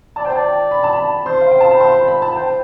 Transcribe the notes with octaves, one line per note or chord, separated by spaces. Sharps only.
D5 A5
C5 G5
D5 A5
B5
A5
B5
C5 C6
F5
G5
A5
B5
C6
B5
B5
A5
C5 G5